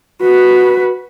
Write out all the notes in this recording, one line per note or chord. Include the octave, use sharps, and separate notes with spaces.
F#4 B4